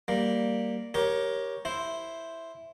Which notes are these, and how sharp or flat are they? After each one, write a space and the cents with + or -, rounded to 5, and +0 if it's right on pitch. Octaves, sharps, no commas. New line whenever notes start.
G3 +0 A#3 +0
G4 +0 A#4 +15 C#5 +0
E4 +0 C5 +0